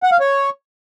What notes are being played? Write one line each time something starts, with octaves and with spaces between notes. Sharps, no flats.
F#5
F5
C#5